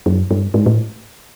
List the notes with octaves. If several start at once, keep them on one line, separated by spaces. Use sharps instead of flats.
F#2
G2
G#2
A2